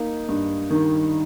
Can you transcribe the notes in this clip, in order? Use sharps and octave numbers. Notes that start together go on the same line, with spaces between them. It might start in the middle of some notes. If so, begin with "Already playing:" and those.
Already playing: A#3 D#4
G2
D#3